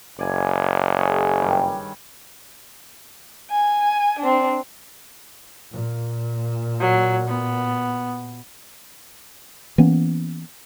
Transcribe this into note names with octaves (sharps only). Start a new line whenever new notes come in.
F#1 D5 G#5
G#4 C#5
G2 D#3 G3
G#5
C4 D4
A#2
F#3
B3
E3 A#3 B3 C#4